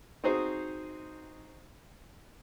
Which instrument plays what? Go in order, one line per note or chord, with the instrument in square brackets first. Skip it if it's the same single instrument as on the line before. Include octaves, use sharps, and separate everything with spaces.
[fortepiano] C4 D#4 F#4 G#4 C5